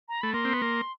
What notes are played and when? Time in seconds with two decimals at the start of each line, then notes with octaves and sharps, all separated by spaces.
0.09 A#5
0.21 A3 B5
0.33 A#3 C6
0.45 C4
0.53 B3
0.62 A#3